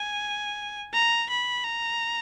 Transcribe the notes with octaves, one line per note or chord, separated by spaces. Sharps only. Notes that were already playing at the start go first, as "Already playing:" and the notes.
Already playing: G#5
A#5
B5
A#5